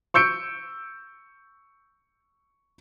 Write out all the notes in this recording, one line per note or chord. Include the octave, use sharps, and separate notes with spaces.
C#6 E6 G6 C#7 D7